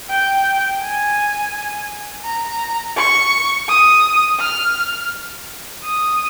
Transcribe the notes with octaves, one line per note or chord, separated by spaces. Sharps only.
G5
G#5
A#5
C#6
D#6
F6
D#6